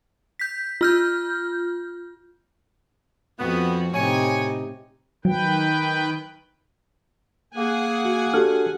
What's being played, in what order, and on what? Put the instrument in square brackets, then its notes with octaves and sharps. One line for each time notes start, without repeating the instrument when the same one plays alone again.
[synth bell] G6 B6
F4 F6 G6
[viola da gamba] F2 F#4 [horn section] B3
[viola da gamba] A2 C3 D#4 [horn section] C#5 G#5
[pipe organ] D#3 B4 G5 [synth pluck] F#3
[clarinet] A#3 [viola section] G#4 F#5 G#5
[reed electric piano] F#4
[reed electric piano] D4 F#4 A4 [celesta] G4 F6